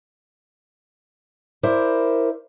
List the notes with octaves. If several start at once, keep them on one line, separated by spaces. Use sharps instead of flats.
E4 A#4 C5 D5